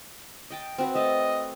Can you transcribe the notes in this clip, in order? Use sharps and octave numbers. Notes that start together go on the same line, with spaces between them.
D#5 G5 A5
C4 F#4 B4
A3 D#5 E5 A5